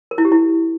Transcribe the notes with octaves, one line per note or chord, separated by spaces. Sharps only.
A#4
E4
G4
E4